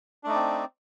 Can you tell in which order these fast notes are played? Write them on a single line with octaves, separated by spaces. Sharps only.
D4 A3 D#4 D5 C4